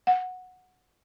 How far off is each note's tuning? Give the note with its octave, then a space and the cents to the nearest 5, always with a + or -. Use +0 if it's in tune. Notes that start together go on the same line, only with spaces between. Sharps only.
F#5 -10